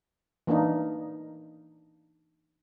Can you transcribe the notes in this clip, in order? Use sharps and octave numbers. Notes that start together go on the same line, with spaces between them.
E3 A#3 D4 D#4